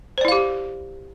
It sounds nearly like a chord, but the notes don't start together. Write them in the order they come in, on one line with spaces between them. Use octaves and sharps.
C5 D5 E4 F5 G4